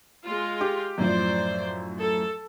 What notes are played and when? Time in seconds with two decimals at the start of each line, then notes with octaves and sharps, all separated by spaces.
0.24 G#3 F4
0.61 G4
0.98 F#2 A2 F3 C5 D5
2.01 A4